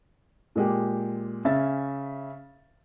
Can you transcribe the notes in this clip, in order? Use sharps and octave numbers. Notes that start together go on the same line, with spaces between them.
A#2 G#3 G4
C#3 C#4 E5 A6